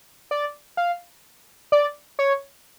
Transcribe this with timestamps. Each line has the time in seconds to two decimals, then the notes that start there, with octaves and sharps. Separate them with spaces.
0.31 D5
0.77 F5
1.72 D5
2.19 C#5